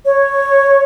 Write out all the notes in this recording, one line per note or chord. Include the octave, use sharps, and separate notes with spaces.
C#5